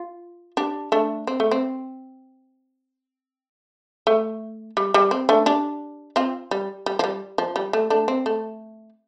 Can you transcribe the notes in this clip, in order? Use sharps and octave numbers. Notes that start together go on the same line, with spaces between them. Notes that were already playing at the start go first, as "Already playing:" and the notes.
Already playing: F4
D4 G4
A3 D4
C4
A3
C4
A3
G3
G3
C4
A3 D4
D4 G4
C4 F4
G3
G3
F3
G3
F3
G3
A3
A3 D4
C4
A3